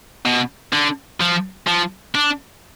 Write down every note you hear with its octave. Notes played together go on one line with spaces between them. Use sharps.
B2
D3
F3
F3
D4